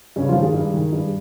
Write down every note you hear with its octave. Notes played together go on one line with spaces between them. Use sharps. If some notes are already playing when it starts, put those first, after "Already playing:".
G2 C#3 C#4
F3 F4
D#3
G#3 G#4
G2
D#3
G2